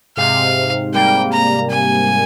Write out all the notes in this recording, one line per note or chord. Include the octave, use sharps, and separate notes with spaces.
G#2 C3 F5
G3 A#3 G5
A#5
G#5